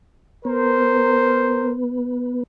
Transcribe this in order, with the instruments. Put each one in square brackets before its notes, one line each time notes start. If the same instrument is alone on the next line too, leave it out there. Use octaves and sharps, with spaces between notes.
[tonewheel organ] B3 [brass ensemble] A#4 C5